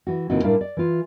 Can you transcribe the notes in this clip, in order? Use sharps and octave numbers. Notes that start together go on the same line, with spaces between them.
E3 F#4
D2 A#2 E3 C4 D#4 F#4
A2 G3 D4 E4 A#4 F5
D5
E3 F4